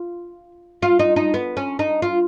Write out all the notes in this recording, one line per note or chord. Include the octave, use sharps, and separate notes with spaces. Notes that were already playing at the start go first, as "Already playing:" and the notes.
Already playing: F4
F4
D#4
D#4
B3
C#4
D#4
F4